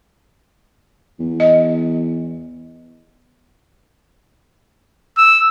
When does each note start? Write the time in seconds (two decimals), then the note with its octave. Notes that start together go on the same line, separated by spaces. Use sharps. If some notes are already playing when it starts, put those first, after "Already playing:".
1.19 E2
1.40 D#5
5.17 E6